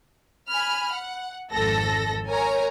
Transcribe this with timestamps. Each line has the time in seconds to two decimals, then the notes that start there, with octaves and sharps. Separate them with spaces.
0.49 G#5 B5 F6
0.94 F#5
1.52 G#1 F2 A4 A#6
2.28 A#4 C#5 G#5 A#5